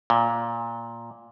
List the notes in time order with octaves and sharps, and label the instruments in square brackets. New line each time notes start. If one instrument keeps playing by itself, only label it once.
[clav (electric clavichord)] A#2